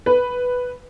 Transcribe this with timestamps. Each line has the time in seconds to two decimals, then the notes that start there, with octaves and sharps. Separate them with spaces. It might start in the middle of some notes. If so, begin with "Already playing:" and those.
0.06 B4